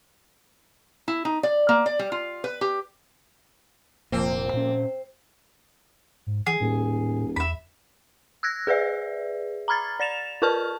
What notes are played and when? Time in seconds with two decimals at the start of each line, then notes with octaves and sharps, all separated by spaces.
1.08 E4
1.25 D#4
1.43 D5
1.69 A#3
1.86 D5
1.99 G3
2.12 F4
2.44 B4
2.61 G4
4.12 F1 A#2 F3 A#3 C4
4.53 A#2 C#4
6.27 G#2
6.46 E3 G#4
6.61 D#1 A2
7.36 E2 E5 B5
8.43 E6 F#6 G#6 A#6
8.67 G#4 B4 D5 E5
9.68 A#5 B5 F6 G#6 A6
10.00 D5 A6 E7 F7
10.42 F4 A#4 B4 A5 C#6 F6